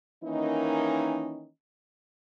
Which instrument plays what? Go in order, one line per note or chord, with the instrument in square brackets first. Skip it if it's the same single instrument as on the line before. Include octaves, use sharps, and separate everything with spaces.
[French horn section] D#3 E3 A#3 C#4 D#4